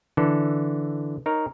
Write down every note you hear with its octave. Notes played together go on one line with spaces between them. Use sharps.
D3 E3 A4
D#4 A#4 C#5